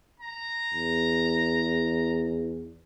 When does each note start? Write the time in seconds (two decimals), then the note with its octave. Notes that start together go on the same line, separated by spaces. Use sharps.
0.20 A#5
0.73 E2